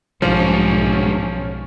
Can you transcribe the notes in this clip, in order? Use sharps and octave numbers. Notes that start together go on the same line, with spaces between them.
B1 G#2 F3 G3 C#4